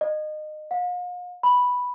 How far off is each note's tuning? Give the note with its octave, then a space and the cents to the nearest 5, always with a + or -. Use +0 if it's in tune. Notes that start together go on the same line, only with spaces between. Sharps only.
D#5 -25
F5 +45
B5 -5